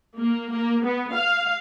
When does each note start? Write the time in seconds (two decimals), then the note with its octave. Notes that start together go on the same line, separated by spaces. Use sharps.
0.18 A#3
0.54 A#3
0.85 B3
1.13 F5